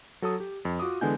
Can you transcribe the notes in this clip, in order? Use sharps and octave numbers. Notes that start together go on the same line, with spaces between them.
F#3 A4 A5 D#6
G4
F2
F4 F#4 D6 D#6
D3 E3 G#3 B3 G#5 G6